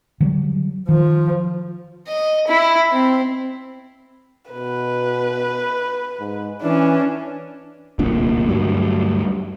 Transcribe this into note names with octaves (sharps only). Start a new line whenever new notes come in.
D3 F#3 G3
D#3 F3
D#5
E4
C4
B2 B4
G#2
E3 C#4 D4
D1 C2 A#2 D4
D2 G2 F#3 G3